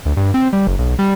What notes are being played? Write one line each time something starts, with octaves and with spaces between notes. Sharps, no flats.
D2
G2
C4
G3
F#1
B1
G3